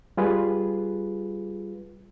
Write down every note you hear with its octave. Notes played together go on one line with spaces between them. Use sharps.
G3 F4 G#4 B4